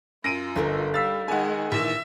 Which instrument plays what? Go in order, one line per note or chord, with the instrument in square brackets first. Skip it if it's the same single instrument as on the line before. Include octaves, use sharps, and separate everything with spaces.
[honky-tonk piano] F#2 [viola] F4 [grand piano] A#6 D7 D#7
[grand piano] G1 [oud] D#4 A4 A#4
[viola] G3 [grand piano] F5 E6 B6 [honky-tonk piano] A6
[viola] D#3 G#3 [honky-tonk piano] F#5 G#5
[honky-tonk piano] A#1 D#3 E3 [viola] E5